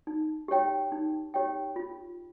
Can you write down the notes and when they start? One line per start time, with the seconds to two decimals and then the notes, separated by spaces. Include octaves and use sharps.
0.07 D#4
0.48 G4 C#5 G5
0.92 D#4
1.34 G4 C#5 G5
1.76 F4